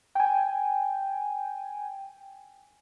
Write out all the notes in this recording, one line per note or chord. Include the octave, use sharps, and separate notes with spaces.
G5 G#5